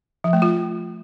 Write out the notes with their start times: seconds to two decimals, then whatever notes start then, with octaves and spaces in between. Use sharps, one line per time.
0.24 F3
0.33 A3
0.42 F4